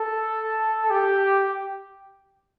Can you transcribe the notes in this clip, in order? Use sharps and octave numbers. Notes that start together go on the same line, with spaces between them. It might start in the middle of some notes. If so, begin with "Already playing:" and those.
Already playing: A4
G4